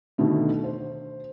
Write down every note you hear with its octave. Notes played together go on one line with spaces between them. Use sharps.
B2 D3 D#3 A3
C5